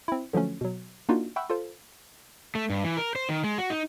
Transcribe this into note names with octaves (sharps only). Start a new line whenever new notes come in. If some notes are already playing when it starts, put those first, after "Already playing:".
C4 E4
D3 F3 F#3 A3 C#4
B2 F#3
A#3 D4 D#4 F4 F#4
E5 F#5 G5 B5 C#6 E6
F4 A4 C5
A3
G2
E3
A#4
C5
D#3
G#3
F#4
D#4